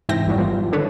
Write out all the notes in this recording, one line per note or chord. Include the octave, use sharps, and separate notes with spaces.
G#2 C3 E3 E5 G5 A#6
G#1 F2 E3 F#3 G3
E3 F3 G3 B3 F4
F3
D3 D#3 D4 A4 B4 C#5